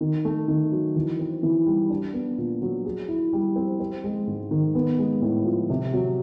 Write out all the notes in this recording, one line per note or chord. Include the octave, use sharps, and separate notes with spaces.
D#3
A3
D#3
F#3
E3
C4
E3
G3
D4
B3
A#2
F#3
G#4
E4
G3
C4
C4
G#3
G#2
D#3
B3
G#3
A2
F3
C3
F#3